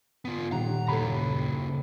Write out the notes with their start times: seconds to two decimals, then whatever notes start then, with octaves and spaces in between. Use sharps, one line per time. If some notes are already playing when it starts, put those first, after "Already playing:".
0.25 B3 F4
0.52 D#1 D#2 F#5 A#5
0.88 C#3 A#3 A4 B5